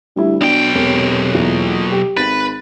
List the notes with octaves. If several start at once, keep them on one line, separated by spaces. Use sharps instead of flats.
D2 G3 E4
B1 B2 D4 G5
E1 C3
E2 A#2
G4
G#1 B4 A6